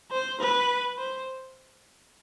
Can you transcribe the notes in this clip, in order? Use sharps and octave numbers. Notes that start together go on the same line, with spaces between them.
C5
B4
C5